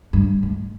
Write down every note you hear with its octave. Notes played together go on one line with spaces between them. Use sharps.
G2
G#2